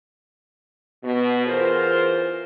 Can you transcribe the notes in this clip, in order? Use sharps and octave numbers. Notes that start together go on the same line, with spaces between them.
B2
E3 F4 G#4 A#4 C5